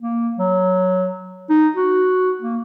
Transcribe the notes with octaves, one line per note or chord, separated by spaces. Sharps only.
A#3
F#3
D#4
F#4
A#3